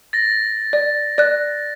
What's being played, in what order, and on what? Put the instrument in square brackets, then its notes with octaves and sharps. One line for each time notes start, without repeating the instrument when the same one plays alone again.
[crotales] A6 A#6
[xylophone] D5
D5 F#6